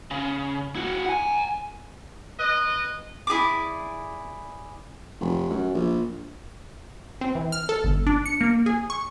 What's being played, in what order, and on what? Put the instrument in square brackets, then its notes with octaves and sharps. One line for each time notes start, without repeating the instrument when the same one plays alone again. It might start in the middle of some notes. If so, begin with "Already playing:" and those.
[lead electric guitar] C#3
E4 F#4
F#5 G#5
[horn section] B4 D#5
[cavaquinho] E4 G#4 D5 D6
[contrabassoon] F1
F#2
A#1
[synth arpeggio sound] C4
E3
F6
A4
G1
D4
C#7
A#3
G#4
C#6